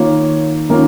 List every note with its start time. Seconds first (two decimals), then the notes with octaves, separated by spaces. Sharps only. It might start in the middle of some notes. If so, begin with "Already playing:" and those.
Already playing: D#3 A#3 F4 C#5
0.69 D#3 A#3 C#4 F4 A#4